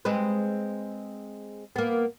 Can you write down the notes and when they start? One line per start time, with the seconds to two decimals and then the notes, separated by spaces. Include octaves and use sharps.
0.05 G#3 C4 B4
1.76 A#3 B3